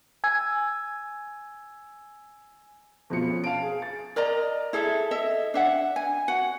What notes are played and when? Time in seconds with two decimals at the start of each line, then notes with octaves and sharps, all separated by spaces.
0.24 G#5 E6 G#6
3.10 F2 B2 F3 F4 C#7
3.31 C#4
3.44 F5 A5 D7
3.62 G#4
3.82 A6
4.16 A#4 D5 D#5 A#5
4.73 E4 G#4 A4 E5
5.11 A4 D#5 E5
5.54 D4 E5 F#5
5.96 G#5
6.28 F#4 F#5